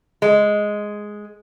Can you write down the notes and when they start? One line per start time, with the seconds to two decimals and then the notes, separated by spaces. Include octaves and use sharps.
0.22 G#3